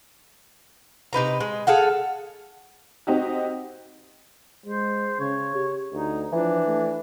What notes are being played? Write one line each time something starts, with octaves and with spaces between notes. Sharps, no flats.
C3 D#4 B4 A#5
G#3
G#4 A4 F5 F#5
C4 D#4 F#4 G4
G#3 C5
C#3 C#5
G4
D2 D#4
E3 F3 D4
A3